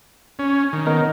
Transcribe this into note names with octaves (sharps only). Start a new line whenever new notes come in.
C#4
D#3
B3 A#4 D#5